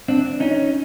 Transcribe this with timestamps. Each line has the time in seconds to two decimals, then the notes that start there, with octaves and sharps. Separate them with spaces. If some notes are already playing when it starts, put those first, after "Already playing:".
0.08 C4 D4
0.40 C#4 D#4